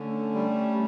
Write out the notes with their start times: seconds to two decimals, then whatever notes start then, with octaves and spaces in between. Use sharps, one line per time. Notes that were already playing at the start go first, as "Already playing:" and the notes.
Already playing: D3 A3 C#4
0.34 G3